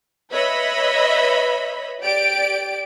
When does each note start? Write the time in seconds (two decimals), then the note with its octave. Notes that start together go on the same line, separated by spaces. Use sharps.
0.31 B4 C#5 D#5 E5 B5
2.02 G4 D5 D7